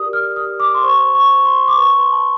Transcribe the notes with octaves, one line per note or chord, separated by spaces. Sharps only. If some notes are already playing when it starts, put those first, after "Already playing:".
Already playing: G4 A#4 D5 D#6
F6
G4 D#6
D6
C6
C5 C#6
C#6
C5
C6
D6
B4 C#6
C6
A5